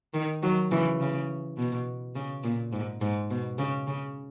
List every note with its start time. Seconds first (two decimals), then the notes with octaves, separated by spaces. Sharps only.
0.14 D#3
0.42 D#3 F#3
0.71 C#3 E3
1.00 C#3
1.58 B2
2.15 C#3
2.44 A#2
2.73 G#2
3.01 G#2
3.31 B2
3.58 C#3
3.87 C#3